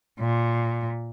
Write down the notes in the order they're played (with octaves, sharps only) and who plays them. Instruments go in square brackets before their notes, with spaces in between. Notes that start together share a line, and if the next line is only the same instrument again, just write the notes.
[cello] A#2